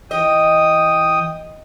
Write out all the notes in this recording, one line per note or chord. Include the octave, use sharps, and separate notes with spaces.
E3 D#5 G5 D#6